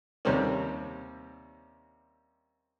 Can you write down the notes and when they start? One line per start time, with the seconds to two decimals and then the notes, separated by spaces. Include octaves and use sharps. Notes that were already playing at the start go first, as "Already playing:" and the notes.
0.25 D#2 C3 G3 C4 C#4